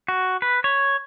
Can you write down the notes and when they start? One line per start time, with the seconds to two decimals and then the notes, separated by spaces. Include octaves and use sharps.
0.08 F#4
0.42 B4
0.64 C#5